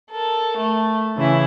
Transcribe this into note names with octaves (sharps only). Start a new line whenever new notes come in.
A4 A#4
A3
C#3 E3 E4